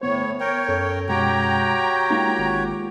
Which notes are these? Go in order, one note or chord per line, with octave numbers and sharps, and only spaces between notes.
G1 A2 B3 C5 C#5
A#4 C#5 G5
F#2 A4
B2 G#3 F#4 G4 C#5 G5 A#5
G#3 A#3 D#4 F4
G#1